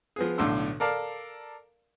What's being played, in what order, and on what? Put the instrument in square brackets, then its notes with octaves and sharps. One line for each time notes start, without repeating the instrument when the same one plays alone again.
[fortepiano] F3 B3 G#4
B1 A2 D3 D4 C6 E6
A4 A#4 D5 F5 A5